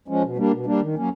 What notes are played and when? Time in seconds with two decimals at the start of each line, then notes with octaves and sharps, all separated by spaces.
0.08 F3 G#3 C#4
0.23 B2
0.37 G3 A#3 D4
0.51 B2
0.66 G3 A#3 D4
0.81 D#3
0.95 F#3 A#3 C#4